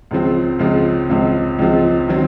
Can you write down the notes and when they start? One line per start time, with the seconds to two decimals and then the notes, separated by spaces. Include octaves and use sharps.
0.11 C#2 C#3 F3 C4
0.59 C#2 C#3 F3 C4
1.10 C#2 C#3 F3 C4
1.59 C#2 C#3 F3 C4
2.08 D#3 F#3 C4